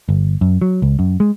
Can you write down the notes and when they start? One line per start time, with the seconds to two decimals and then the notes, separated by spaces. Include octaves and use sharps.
0.09 G1
0.41 F#2
0.62 F#3
0.82 C#2
0.99 F#2
1.20 G#3